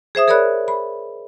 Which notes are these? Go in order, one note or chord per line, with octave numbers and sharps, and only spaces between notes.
G#4 C5 E5 D#6
G#4 A#4 C#5 D5 B5 F#6
B5